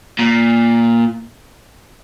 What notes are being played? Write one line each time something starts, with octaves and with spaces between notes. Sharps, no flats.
A#2